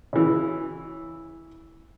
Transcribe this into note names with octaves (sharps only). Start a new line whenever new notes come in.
C#3 E3